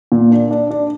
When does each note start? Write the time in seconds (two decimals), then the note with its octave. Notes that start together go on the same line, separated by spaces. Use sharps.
0.12 A#2
0.32 D4
0.51 D4
0.71 D4